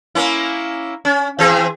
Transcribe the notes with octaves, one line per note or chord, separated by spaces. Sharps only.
A#3 C#4 E4
C#4
E3 C4 G#4